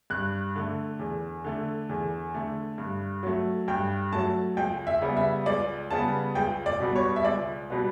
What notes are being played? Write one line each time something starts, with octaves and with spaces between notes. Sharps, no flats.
G2 F#6
D3 A3
E2
D3 A3
E2
D3 A3
G2
F#3 A3
G2 G5
F#3 A3 A5
C#2 G5
E5
C#3 G3 B3
E5
C#2 D5
C#3 G3 B3 A5
C#2 G5
D5
B2 G3 B3
C#5
E5
C#2 D5
B2 G3 B3